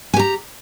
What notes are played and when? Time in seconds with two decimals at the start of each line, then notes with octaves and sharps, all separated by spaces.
0.14 G#5
0.16 G4
0.19 A#5